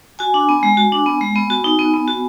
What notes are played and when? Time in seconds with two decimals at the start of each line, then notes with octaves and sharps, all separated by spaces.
0.19 F#4 G#5
0.34 D4
0.49 B3
0.63 G#3
0.77 F#4
0.92 D4
1.06 B3
1.21 G#3
1.36 B3
1.50 F#4
1.64 D#4
1.79 B3
1.94 B3
2.08 F#4